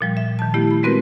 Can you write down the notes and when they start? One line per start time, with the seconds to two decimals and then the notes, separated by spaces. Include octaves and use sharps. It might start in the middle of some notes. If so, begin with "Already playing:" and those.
0.01 A#2 F3 G3
0.17 E5
0.39 D#3 A5
0.54 A3 B3 E4 G4
0.71 B5
0.83 G#3 B3 C4 F#4 A#4 B4